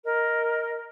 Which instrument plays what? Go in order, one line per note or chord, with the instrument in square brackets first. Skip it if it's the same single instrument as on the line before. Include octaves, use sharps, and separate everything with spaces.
[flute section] A#4 D#5